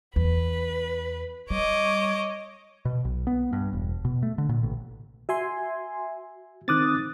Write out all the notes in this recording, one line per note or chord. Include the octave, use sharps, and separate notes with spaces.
E2 B4
G3 C#5 D#5 D6
B2
B1
B3
G2
E1
B2
A3
D3
A#2
A1
F#4 E5 G#5 C6
D#3 C4 D6 D#6 F#6 A6